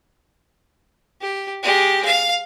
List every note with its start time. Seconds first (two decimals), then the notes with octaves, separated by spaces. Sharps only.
1.21 G4
1.63 G#3 G4
2.05 F5